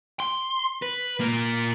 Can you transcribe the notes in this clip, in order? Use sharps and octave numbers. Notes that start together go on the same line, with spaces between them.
C6
B4
A#2 A#3